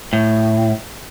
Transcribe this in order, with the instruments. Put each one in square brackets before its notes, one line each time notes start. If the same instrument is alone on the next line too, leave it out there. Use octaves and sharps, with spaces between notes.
[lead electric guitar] A2